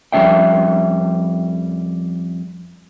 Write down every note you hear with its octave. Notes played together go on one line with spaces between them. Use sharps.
F2 G3 G#3 C#4 E5 G5